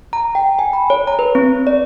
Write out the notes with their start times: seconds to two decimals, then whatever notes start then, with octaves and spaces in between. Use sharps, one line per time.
0.13 A#5
0.35 G5
0.59 G#5
0.73 B5
0.90 C#5
1.07 A#5
1.19 B4
1.35 C4
1.67 D5